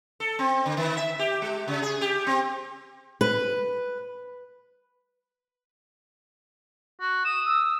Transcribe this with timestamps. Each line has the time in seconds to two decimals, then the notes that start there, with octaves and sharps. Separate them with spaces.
0.20 A4
0.39 C4
0.66 D3
0.77 D#3
0.97 E5
1.19 G4
1.42 G#3
1.68 C#3
1.82 G#4
2.01 G4
2.27 C4
3.21 B4
7.00 F#4
7.25 D#6 E7
7.46 E6